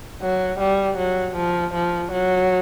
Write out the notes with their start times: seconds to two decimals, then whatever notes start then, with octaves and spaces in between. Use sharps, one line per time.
0.22 F#3
0.60 G3
0.98 F#3
1.36 F3
1.74 F3
2.12 F#3